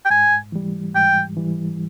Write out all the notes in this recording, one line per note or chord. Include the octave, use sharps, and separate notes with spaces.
G5
G#2 G#5
E3 G3
G#2 G5
E3 G3